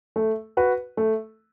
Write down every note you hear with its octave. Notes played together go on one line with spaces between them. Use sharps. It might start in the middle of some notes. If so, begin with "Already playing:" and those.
A3
F#4 B4
A3